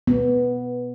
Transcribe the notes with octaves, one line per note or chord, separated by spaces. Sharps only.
B3